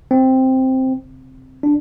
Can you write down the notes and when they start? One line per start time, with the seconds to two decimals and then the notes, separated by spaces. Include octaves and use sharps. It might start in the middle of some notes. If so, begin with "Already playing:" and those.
0.11 C4
1.63 D4